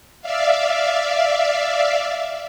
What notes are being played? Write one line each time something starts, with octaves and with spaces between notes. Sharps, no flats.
D5 E5 F5